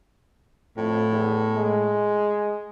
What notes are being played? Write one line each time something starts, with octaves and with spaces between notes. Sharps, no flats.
F2 A2
E2
G#3